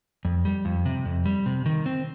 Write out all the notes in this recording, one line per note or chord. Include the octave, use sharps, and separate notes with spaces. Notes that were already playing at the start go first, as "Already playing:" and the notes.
F2
G3
F2
C3
F2
G3
C3
D#3
C4